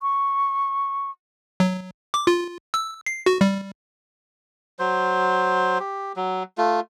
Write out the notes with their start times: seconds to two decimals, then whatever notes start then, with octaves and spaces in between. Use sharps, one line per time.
0.02 C#6
1.60 F#3
2.14 D6
2.27 F4
2.74 E6
3.06 C7
3.26 F#4
3.41 G3
4.79 F#3 C5
5.80 G4
6.16 F#3
6.58 A3 F4